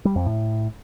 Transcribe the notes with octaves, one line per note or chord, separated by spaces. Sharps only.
G3
F2
A2